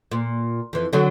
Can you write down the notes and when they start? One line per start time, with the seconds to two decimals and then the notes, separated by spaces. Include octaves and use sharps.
0.11 A#2
0.73 F2 E3
0.93 D3 F#3